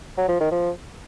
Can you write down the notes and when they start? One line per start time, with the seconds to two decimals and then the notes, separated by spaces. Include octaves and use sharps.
0.18 F#3
0.28 F3
0.40 D#3
0.52 F3